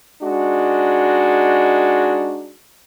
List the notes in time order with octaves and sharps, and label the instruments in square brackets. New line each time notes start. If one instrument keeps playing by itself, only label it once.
[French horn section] G#3 D4 D#4 F#4